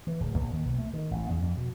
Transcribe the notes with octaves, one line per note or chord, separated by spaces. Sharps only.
E3
D1
A#1
D#2
B1
A3
D#3
A1
E2
F2
B2